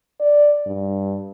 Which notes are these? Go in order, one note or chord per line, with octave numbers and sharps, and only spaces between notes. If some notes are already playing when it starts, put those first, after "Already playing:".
D5
G2